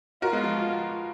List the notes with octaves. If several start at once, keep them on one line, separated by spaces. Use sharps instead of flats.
F4 F#4 A#4
G#3 B3
F3
F3